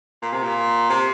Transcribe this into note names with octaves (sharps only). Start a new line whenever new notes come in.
A#2
C3
A#2
C3